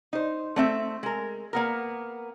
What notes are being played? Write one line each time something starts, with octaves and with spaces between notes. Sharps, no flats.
D#4 C5
A3 C4 E5
G#3 A#4
A#3 B3 A#4